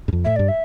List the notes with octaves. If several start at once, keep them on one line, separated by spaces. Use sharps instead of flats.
G2
F2
A2 E5
G2 D5
E5